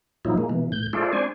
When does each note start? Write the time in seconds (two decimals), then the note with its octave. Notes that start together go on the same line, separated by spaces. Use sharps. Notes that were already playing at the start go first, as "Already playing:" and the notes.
0.25 A#2 F3 F#3 D#4 E4
0.38 G#3 A#3
0.50 B2 E3
0.72 A2 G6
0.93 G#3 E4 F4 A4 C5 D5
1.13 C4 D4 C5 D5 G#5